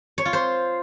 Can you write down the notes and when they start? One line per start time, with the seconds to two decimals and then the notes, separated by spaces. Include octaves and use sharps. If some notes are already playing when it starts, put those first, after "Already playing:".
0.18 C#5
0.25 F4
0.33 C5